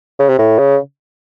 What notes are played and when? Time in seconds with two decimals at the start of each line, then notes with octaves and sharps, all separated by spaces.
0.19 C#3
0.29 C3
0.38 A2
0.59 C#3